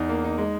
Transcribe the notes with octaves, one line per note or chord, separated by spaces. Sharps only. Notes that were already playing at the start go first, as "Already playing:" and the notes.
Already playing: E2 D#4
A#3
D#4
G#3